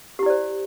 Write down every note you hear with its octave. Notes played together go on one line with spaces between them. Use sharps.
E4 G4 C5 D5